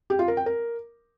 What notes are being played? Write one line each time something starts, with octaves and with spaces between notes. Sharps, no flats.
G4
F4
A#4
G5
A#4